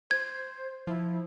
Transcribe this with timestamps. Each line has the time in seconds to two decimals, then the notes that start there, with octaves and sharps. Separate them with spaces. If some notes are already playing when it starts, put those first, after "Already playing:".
0.11 C5 G#6
0.87 F3 E4